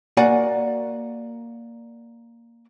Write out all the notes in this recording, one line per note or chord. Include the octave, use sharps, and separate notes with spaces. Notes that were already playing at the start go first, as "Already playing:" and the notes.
A#3 F#4 D5 F#5 G#5